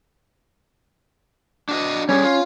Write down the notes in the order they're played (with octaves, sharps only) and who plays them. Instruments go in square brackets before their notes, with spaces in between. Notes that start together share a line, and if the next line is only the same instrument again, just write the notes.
[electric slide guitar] D4 F#4 D#5
[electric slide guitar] G3 G4 G#4 [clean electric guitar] C#4
[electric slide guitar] F4